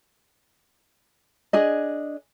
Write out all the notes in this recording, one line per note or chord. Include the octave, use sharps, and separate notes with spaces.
D4 G#4 D#5